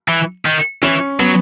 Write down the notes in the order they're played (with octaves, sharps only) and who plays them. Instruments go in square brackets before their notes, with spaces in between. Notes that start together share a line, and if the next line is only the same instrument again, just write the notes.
[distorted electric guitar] E3
D#3
[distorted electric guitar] E3 [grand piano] C#4
[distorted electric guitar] F#3 [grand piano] B3